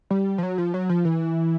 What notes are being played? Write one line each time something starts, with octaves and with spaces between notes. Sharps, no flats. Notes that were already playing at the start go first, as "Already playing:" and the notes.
G3
F3
F#3
F3
F#3
F3
E3